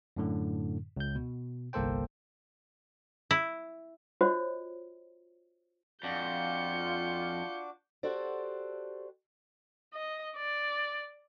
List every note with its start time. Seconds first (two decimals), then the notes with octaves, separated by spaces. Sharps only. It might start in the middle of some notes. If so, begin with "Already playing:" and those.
0.16 F#2 A2 D3
0.97 C#2 G6
1.15 B2
1.73 G1 C2 A#3 A4 C5 G5
3.31 E4
4.21 F4 F#4 C5 C#5 D#5
6.03 F2 D4 F4 F#4 D6 G6 C#7
8.03 F#4 G4 A4 C5 D5
9.94 D#5
10.36 D5